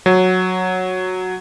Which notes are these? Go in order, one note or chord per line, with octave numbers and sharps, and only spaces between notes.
F#3